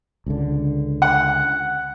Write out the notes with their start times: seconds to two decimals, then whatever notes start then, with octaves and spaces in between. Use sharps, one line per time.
0.26 C#2 D3
1.02 F#5